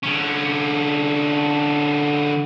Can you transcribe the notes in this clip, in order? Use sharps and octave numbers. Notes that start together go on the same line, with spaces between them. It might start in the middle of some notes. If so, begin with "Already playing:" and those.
D3 C#4